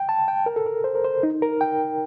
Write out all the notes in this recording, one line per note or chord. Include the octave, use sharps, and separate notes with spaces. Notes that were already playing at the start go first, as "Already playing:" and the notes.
Already playing: G5
A5
G5
A#4
A4
A#4
C5
A#4
C5
D#4
A#4
G5